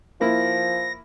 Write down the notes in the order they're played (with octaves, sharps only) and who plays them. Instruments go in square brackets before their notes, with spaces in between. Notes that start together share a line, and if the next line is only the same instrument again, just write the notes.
[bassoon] F3 [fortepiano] A#3 E4 [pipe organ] A#6